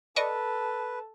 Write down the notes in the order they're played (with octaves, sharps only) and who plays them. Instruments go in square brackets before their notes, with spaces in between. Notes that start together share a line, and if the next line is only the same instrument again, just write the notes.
[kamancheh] A4 [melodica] B4 [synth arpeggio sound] D5 D#5 C#6